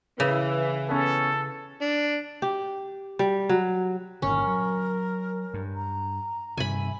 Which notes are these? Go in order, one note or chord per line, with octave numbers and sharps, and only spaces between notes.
C#3 E3
B3 C#4 A4
D4
G4
G3
F#3
G1 A#2 D#3 C#4 A#4
F#3
G2
A#5
G2 C3 D#3 E5 G#5 B5